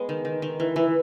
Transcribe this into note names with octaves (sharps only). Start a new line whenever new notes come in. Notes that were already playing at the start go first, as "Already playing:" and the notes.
Already playing: G#3 B3
D#3
D#3
D#3
E3
E3